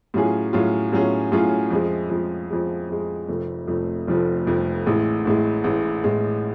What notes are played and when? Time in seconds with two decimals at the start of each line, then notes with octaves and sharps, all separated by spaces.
0.14 A2 F#3 C#4 F4 G#4
0.53 A2 F#3 C#4 F4 G#4
0.92 A2 F#3 C#4 F4 G#4
1.32 A2 F#3 C#4 F4 G#4
1.71 F2 F3 G#3
2.10 F2 F3 G#3
2.50 F2 F3 G#3
2.90 F2 F3 G#3
3.28 F1 F2 F3 A3
3.67 F1 F2 F3 A3
4.07 F1 F2 F3 A3
4.46 F1 F2 F3 A3
4.86 A1 A2 G#3
5.25 A1 A2 G#3
5.64 A1 A2 G#3
6.04 A1 A2 G#3